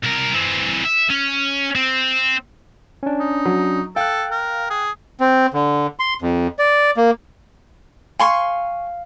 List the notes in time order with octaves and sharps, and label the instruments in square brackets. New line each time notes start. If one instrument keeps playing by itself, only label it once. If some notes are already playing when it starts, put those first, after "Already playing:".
[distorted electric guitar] C2 A#4
E3 C4
E5
C#4
C4
[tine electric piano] C#4 D4
[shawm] D#4
[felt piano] F#3
[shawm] A4 [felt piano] F5 [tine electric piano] G5 F#6
[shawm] A#4
G#4
[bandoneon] C4
D3
C6
F2
D5
A#3
[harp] F5 [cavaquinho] G#5 C6 C#6